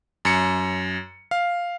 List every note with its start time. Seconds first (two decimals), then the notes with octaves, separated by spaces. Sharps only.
0.25 F#2 C#7
1.31 F5